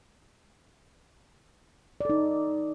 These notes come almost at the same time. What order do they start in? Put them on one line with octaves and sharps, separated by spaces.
D5 A4 D#4